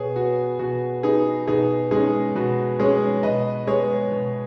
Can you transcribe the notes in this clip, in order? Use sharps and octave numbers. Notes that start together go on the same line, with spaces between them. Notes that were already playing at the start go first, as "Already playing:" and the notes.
Already playing: B2 G#4 C#5
B3 F#4
B2 F#4
B3 D#4 G#4
B2 D#4 G#4
G#3 C#4 D#4 G#4
B2 F#4 B4
G#3 C#4 G#4 C#5
B2 B4 D#5
G#3 B3 G#4 C#5
B2